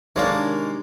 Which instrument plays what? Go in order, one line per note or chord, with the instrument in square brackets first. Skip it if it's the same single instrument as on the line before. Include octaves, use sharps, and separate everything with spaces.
[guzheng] C3 D4 [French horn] D#3 [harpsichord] G#3 A#3 [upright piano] C#5 D5 F5